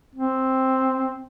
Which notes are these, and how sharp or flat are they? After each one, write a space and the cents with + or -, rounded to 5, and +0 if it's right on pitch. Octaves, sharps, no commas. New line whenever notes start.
C4 +5